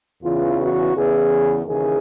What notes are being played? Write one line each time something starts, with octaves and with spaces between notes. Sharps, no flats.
E2 C#3 E3 F4
F#4
E2 C#3 E3 G#4
D#2 C#3 E3 G#4